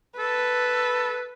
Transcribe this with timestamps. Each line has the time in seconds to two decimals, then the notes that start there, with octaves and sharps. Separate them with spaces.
0.19 A4 B4